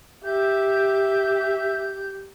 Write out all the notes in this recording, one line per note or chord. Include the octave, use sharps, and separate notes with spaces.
G4 E5 G6